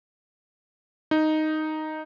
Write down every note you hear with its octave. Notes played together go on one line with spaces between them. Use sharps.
D#4